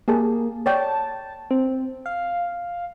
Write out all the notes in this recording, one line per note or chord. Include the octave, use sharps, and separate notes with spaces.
A#3 G4 G#4 A5
C#5 D5 G5 A5
C4
F5